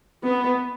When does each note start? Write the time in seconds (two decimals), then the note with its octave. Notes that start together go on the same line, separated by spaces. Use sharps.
0.23 B3